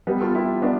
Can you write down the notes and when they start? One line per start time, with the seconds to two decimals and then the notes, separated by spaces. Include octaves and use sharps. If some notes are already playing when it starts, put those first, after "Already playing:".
0.07 G3 B3
0.20 F4 A4
0.35 E4 G4
0.62 B3 D4